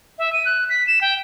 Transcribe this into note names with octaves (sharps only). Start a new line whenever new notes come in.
E5
D#7
F#6
B6
E7
G5